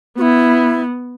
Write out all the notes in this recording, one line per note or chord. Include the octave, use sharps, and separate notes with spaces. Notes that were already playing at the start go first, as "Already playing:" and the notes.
B3 E4 F#4